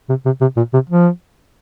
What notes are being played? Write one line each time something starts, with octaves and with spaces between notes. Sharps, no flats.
C3
C3
C3
A#2
C3
F3